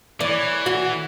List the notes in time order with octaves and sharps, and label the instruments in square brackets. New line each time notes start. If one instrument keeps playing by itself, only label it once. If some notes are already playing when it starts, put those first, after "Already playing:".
[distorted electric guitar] E3 [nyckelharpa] E4 C#5 [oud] D5
[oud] F#4